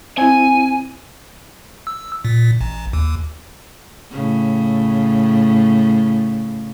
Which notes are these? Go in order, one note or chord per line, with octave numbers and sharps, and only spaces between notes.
C4 E4 G#5
E6
A#2
A1
D#2
A2 C#3